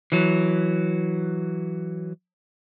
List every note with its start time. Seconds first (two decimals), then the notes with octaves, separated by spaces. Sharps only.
0.12 E3 F#3